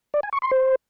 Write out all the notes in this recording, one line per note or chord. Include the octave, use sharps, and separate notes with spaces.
D5
G#5
C#6
C6
C5